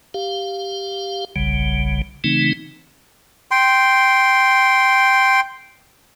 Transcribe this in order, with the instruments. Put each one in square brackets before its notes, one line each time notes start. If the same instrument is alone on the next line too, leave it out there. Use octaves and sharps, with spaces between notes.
[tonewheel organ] G4 F5
F#1 B1 C#3 G3
C#3 E3 A3 C4 D#4
[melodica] G5 C6